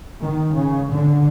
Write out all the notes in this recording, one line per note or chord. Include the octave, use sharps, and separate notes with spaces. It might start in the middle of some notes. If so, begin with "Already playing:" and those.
D#3
C#3
D3